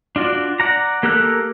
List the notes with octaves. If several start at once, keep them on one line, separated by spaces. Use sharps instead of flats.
D4 F4 F#4 D5
D5 F#5 A#5
A#3 G4 A4 A#4 F#6